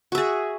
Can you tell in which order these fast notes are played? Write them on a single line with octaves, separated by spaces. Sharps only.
F#4 E5 G#4